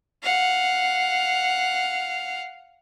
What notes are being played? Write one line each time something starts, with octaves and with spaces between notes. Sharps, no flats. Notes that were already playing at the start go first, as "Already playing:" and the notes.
F5 F#5